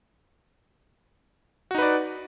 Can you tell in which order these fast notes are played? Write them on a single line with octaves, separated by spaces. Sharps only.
F#4 D#4 B4 D5